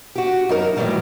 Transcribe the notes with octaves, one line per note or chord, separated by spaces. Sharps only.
F#4 G4
F#2 D#4 A#4
A2 D#3 E3 F#3 G3